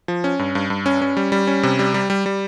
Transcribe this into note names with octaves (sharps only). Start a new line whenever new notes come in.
F3
C#4
G2
G2
G2
C#4
C#4
G3
G3
C#4
C3
G3
G3
G3
G3